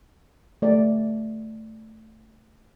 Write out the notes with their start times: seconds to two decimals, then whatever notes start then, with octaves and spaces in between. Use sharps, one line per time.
0.62 A3 D5